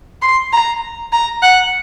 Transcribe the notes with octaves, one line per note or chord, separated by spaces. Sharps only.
C6
A#5
A#5
F#5